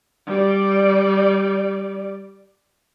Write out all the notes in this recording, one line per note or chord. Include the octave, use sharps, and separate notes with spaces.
G3 D5